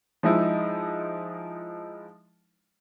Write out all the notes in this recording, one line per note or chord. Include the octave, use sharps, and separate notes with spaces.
F3 G#3 D#4 E4